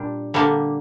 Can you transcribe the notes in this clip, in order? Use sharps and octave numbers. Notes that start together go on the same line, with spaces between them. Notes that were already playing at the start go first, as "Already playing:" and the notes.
Already playing: A#2 G3 D4
D3 G3 A#3